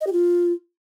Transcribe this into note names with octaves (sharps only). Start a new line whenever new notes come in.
D#5
G4
F4